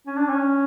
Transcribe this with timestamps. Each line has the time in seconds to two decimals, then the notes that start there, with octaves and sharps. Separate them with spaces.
0.07 C#4
0.18 D4
0.29 C#4